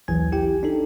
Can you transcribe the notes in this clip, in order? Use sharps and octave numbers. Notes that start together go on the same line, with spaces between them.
A#1 D#2 E3 F#3 G#5 G#6
E4 G4 G5
D4 D#4 A4